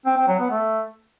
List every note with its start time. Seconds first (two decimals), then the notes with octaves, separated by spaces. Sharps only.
0.06 C4
0.17 C4
0.28 F#3
0.39 B3
0.51 A3